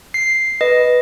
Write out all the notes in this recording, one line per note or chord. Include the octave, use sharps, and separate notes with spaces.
C7
B4 D#5